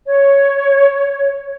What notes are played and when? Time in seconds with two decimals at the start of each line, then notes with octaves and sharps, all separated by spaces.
0.06 C#5